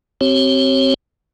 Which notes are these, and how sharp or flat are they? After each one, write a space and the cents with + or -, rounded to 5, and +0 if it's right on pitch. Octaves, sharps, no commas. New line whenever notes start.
C4 +5 G4 -35 C#5 -30